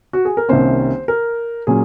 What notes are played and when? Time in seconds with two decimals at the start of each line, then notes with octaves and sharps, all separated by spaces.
0.13 F#4
0.25 G#4
0.37 A#4
0.49 C2 C3 D#3 A#3 C#4 C5
1.08 A#4
1.67 A#2 F#3 C#4 G#4